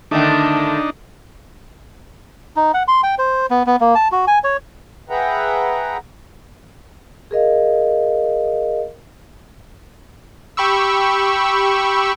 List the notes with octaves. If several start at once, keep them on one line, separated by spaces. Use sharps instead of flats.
D3 D#3 A3 D4 D#4
D#4
F#5
C6
G5
C5
B3
B3
A#3
A5
F#4
G#5
C#5
G#4 B4 E5 F#5 G5 A#5
G#4 A#4 D#5 F5
G4 B5 C#6 E6